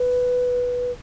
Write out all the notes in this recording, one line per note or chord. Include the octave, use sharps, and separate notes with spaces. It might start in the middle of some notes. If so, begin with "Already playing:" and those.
Already playing: B4